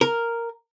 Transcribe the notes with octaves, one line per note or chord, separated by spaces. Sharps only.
A#4